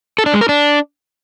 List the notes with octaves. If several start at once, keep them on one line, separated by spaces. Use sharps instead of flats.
A4
D4
G#3
A#4
D4